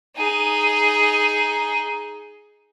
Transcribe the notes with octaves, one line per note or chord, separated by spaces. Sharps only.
D#4 G#4